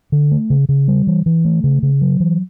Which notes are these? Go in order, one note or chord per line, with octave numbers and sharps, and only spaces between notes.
D3
A3
C#3
C#3
G3
E3
E3
A3
C#3
C#3
F#3
E3